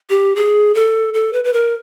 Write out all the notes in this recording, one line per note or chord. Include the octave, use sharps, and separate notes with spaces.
G4
G#4
A4
A4
B4
B4
A#4